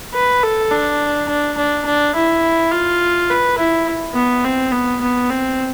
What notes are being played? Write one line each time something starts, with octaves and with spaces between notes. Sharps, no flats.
B4
A4
D4
D4
D4
D4
E4
F4
B4
E4
B3
C4
B3
B3
C4